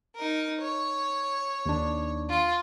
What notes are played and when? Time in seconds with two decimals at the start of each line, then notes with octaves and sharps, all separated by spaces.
0.15 D#4 A#4
0.61 C#5
1.66 D#2 D4
2.29 F4